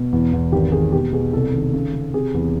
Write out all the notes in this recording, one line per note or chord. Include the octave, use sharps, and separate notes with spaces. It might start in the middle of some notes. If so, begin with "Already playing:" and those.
Already playing: B2
E2
E2
G#1 G4
D#3 G#4
B2 G4
B2 G#4
C2 A4
D#3
C#3
C#3
C3 G#4
E2